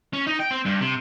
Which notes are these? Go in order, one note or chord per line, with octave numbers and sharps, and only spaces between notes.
C#4
D#4
G5
C4
G2
C3